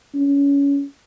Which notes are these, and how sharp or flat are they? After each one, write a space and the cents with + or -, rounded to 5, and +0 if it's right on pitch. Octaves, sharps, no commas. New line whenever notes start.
C#4 +25